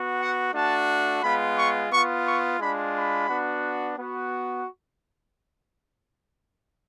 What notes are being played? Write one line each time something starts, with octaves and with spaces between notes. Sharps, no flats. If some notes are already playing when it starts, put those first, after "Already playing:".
Already playing: B3 F#4
F#5
A3 D4 F#4 A5
G#3 B3 F4 B5
C#6
B3 F4 C#6
C#6
G#3 D4 F4 B5
B5
B3 D4 F#4
B3 F#4